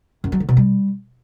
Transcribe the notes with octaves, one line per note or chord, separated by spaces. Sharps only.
F#2
F#3
D3
B2
G3